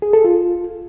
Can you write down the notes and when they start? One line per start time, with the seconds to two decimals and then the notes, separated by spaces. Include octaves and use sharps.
0.02 G#4
0.13 A4
0.24 F4